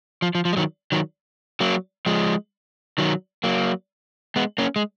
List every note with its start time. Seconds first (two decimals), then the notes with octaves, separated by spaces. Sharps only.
0.22 F3
0.35 F3
0.45 F3
0.53 G#3
0.57 D#3 F#3
0.92 D#3 F#3
1.60 F#3 A#3
2.06 F3 G#3
2.98 D#3 F#3
3.44 F#3 A#3
4.36 G#3 B3
4.58 A#3 C#4
4.76 G#3